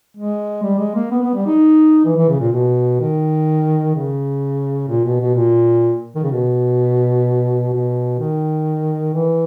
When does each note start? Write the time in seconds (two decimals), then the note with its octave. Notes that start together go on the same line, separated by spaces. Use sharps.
0.17 G#3
0.63 G3
0.79 G#3
0.95 A#3
1.11 B3
1.22 B3
1.34 G3
1.46 D#4
2.05 E3
2.17 E3
2.29 C#3
2.40 A#2
2.53 B2
3.00 D#3
3.95 C#3
4.89 A#2
5.05 B2
5.21 B2
5.35 A#2
6.15 D#3
6.23 C#3
6.31 B2
7.73 B2
8.19 D#3
9.14 E3